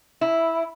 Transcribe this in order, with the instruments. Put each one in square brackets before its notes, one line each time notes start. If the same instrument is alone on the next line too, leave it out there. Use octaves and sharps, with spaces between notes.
[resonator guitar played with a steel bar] E4